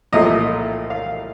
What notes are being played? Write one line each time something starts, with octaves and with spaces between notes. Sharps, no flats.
C2 A#2 F3 A3 D#5
F5